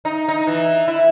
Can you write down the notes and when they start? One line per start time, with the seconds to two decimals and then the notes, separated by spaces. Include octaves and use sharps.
0.05 D#4
0.28 D#4
0.47 E3
0.88 E4